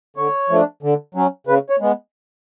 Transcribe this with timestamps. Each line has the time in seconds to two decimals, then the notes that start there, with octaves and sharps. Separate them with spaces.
0.17 D3 C#5
0.50 F3 A3 D4
0.83 D3
1.15 F#3 C#4
1.47 C#3 B4
1.70 C#5
1.80 G#3 B3